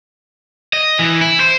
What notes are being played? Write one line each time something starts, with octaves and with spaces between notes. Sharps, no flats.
D#5
E3
E4
C5